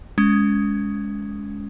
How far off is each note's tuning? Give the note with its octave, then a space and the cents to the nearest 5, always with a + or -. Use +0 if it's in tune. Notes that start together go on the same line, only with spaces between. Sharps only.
G#3 +0 C#4 +30